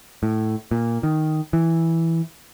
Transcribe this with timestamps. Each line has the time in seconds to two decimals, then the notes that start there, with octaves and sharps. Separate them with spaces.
0.23 A2
0.71 A#2
1.03 D#3
1.53 E3